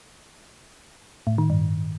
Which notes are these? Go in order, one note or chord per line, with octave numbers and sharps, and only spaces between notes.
A2
D#3
G2